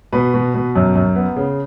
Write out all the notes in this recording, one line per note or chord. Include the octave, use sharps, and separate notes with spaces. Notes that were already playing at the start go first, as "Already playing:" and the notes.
B2 B4
B2
B2
F#2
F#2
B3
C#3